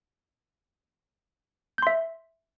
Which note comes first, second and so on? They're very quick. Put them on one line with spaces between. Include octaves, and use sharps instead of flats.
G6 C6 E5